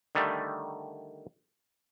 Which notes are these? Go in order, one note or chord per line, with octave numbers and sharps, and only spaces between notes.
D3 D#3 G3 A3